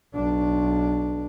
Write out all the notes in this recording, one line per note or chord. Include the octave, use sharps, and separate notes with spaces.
B1 D4